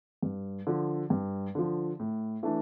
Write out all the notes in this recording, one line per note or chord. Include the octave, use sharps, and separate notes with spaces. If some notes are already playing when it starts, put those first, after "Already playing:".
G2
D3 F3
G2
D3 F3
A2
E3 A3 D4